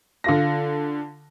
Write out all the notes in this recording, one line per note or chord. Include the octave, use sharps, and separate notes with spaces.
D3 F4 A#6